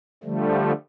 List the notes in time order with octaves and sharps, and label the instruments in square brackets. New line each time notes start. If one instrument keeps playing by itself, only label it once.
[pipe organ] D3 F3 G3 A3